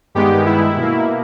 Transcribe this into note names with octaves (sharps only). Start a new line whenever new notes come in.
G2 D#3 G#3 B3 G4
E4
B2 A#3